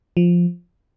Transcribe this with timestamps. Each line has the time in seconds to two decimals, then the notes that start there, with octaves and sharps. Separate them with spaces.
0.17 F3